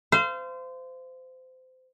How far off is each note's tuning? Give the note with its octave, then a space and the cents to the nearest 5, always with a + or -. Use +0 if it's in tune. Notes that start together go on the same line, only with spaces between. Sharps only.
C5 -25 F5 -30